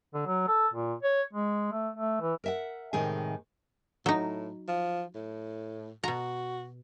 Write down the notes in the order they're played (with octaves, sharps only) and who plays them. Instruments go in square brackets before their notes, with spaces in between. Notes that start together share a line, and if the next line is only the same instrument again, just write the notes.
[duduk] D3
F#3
A4
A#2
C#5
G#3
A3
A3
E3
[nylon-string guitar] A#4 E5 F#5
A2 C3 D#3 G#3 G#4
[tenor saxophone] A2 [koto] F#3 D#4
[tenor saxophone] F3
A2
[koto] B2 A#5 [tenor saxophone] F#4